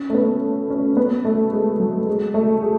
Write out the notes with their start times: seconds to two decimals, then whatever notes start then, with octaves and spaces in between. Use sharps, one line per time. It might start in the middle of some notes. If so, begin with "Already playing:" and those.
Already playing: C#4
0.10 A3
0.15 B3
0.70 C#4
0.97 B3
1.25 A3
1.52 G#3
1.80 F#3
2.07 G#3
2.34 A3
2.62 G#4